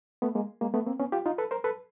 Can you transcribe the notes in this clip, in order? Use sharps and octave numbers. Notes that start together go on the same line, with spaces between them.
A3 B3
G#3 A#3
G#3 A#3
A3 B3
A#3 C4
B3 C#4
F4 G4
D#4 F4
A4 B4
A#4 C5
A4 B4